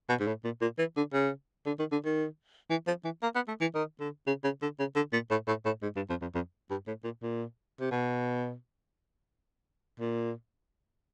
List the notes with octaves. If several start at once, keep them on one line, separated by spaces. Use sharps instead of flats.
B2
G#2
A2
A#2
A#2
E3
D3
C#3
D3
D#3
D3
D#3
E3
F3
E3
A#3
B3
A3
E3
D#3
D3
C#3
C#3
D3
C#3
D3
A#2
A2
A2
A2
G#2
G2
F2
F2
F2
G2
A2
A#2
A#2
C3
B2
A#2